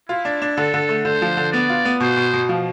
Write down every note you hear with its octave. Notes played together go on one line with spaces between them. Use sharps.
E4 F4
D4
D4
D3 A4
D3
A3
D3 C5
F3
D3
B3 D5
F4
B3
B2 C5
B2
B2
F3